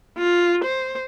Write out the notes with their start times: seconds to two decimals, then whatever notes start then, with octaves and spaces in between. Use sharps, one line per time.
0.18 F4
0.64 C5